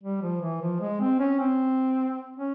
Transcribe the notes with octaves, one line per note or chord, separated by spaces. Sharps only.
G3
F3
E3
F3
G#3
C4
C#4
C4
C#4